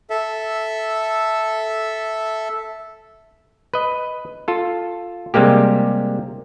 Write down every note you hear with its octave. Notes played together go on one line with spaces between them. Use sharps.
A4 E5
B4 D#5
F4 A4
C3 G3 G#3 A#3 G4